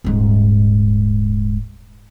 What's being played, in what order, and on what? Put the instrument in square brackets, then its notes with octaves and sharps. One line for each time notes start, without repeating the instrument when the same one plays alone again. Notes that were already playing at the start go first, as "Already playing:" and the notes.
[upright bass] D#1 G#2